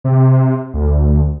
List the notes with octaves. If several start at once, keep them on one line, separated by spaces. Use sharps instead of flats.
C3
D2